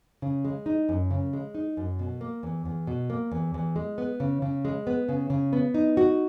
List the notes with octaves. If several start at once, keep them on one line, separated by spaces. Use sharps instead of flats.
C#3
G#3
D#4
F#2
C#3
G#3
D#4
F#2
B2
A#3
E2
E2
B2
A#3
E2
E2
G#3
B3
C#3
C#3
G#3
B3
C#3
C#3
B3
D#4
F#4